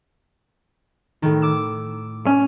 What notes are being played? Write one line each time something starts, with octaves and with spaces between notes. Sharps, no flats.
A2 D#3
D6 E6
C#4